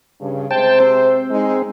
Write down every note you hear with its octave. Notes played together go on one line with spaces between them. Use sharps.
G2 C#3
C3 G#3 C5 G5 A5
C4
G#3 D#4